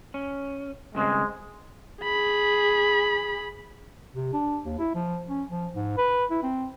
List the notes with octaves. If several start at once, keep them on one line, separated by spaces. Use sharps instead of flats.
C#4
G2 C#3 G#3 C4
G#4 B5
C3
D4
D#2
E4
F3
C#4
F3
G#2
B4
E4
C4